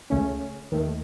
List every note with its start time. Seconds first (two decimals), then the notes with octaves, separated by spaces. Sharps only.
0.10 C#2 C#3 A3 C#4
0.72 D#2 D#3 A3